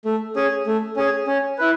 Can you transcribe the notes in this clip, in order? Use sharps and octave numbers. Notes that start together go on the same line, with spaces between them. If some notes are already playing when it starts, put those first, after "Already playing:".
A3
C#4 G#4
A3
C#4 G#4
C#4
E4 B4